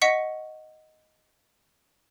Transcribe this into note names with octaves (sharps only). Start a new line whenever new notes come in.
D#5 F#5 C#6 B6 C#7